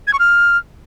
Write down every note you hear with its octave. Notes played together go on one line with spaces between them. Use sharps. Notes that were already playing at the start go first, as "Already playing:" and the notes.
G#6
C#6
F6